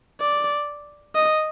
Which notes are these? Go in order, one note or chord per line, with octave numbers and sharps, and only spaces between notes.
D5
D#5